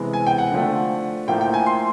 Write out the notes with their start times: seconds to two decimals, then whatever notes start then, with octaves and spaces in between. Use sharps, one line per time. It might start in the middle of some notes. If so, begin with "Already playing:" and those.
Already playing: C3 E3 G#3 B3
0.13 G#5
0.27 G5
0.38 F#5
0.51 D3 F3 A3
1.28 A2 F3 A#3 G5
1.41 G5
1.54 G#5
1.66 C6